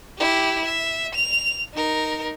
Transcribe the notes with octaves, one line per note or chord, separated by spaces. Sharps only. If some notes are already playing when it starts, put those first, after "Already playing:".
E4 G4
E5
F7
D#4 A#4